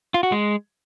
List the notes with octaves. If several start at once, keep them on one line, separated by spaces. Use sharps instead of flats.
F4
F#4
G#3